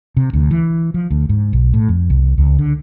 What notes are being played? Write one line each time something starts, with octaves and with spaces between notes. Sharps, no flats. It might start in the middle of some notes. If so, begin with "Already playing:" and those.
C3
D2
E3
F3
D2
G#2
B1
A2
F2
C2
C#2
D3